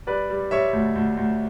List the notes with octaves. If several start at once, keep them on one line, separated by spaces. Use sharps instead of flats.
G3 B4 D5
G3
G3 C#5 E5
D2
D2
D2